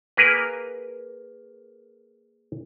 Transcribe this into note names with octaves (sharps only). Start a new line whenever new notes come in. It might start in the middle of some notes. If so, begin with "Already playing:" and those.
A#3 G#4 A#4 B4